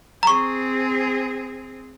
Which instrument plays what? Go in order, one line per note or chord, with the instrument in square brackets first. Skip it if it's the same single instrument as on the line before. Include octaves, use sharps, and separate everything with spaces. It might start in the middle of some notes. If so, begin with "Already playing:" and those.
[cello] C4 G#4 [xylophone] A#5 C#6